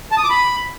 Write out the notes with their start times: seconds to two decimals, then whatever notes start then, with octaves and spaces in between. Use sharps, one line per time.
0.11 A5
0.17 D#6
0.24 D6
0.30 B5